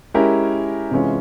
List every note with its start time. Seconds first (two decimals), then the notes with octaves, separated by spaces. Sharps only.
0.14 G#3 C#4 E4 G4 A#4
0.91 C3 E3 G#3 C#4 F4